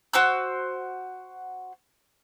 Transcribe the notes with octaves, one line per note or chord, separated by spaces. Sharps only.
F#4 C5 E6